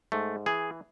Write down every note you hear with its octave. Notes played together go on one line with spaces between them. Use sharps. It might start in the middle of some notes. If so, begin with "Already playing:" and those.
G#2 A3
E3 G#4